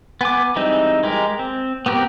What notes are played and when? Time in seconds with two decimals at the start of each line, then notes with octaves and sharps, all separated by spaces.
0.21 B3 G#5 D6
0.56 E3 G3 G#3 C4 D#4
1.03 G#3 G4 A#4
1.39 C4
1.86 B3 C4 G4 A#4